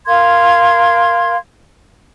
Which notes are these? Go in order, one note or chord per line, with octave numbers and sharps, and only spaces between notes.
A#4 F5 C6 G#6